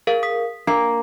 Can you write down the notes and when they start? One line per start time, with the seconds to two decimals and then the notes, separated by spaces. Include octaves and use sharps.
0.07 G#4 A#4 F5
0.23 D#6 B6
0.67 A#3 D4 C7